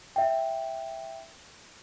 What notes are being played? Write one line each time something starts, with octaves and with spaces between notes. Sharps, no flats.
E5 G5